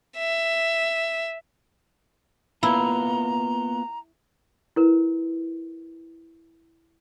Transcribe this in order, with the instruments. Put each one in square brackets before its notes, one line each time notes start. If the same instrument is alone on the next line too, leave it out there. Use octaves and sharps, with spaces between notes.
[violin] E5
[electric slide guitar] A#3 B3 F4 [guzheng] E4 [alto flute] A#5
[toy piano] E4 A#4 B4